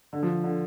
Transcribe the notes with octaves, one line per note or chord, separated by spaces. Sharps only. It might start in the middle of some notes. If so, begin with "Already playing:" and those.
D3
F3
D3